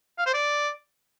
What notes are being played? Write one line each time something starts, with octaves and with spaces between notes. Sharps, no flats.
F5
C5
D5